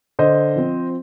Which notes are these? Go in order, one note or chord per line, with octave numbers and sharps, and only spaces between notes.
D3 C5 D#5
F3 C4